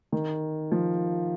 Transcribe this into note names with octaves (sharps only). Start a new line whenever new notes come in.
D#3
F3